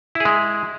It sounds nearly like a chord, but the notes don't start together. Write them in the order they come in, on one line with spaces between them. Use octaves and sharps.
E4 G#4 G#3